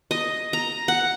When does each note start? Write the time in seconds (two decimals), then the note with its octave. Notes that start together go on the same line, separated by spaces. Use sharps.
0.11 D#5
0.53 A#5
0.88 F#5